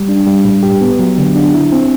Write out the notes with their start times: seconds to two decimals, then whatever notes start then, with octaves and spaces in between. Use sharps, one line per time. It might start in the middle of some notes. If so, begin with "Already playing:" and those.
Already playing: G3
0.09 D4
0.27 G3
0.45 A2
0.63 G4
0.81 B3
0.99 F#3
1.18 D3
1.36 D4
1.54 E4
1.72 C4